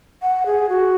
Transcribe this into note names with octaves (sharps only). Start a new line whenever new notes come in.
F#5
G#4
F#4